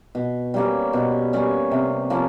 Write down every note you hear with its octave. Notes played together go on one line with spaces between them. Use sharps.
B2
G3 A#3 C#4
B2
G3 A#3 C#4
C3
F3 A#3 C#4